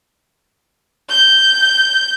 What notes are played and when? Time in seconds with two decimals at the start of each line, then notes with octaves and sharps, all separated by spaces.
1.10 G6